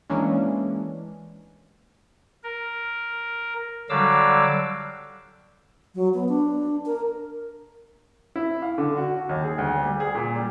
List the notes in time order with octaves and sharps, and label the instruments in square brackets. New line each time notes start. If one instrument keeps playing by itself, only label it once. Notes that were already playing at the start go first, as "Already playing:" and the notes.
[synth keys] E3 G#3 A#3 C#4 D4
[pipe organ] A#4
D3 F#3 G3 F5 D6 E6
[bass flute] F#3
B3
D4
A#4
[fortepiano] E4
F5
D3
F#4
F#4
D#2
G#4
D2
G3
G#4
A#2
G3